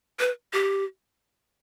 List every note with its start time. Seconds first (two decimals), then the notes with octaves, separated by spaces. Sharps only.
0.19 B4
0.53 G4